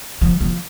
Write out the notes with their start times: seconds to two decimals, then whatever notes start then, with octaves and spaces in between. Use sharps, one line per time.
0.21 F3
0.41 F3